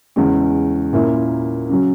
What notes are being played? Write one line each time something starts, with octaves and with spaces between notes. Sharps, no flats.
E2 C#3 G#3 C#4
A#2 A#3 C#4 E4
C#3 F#3 C#4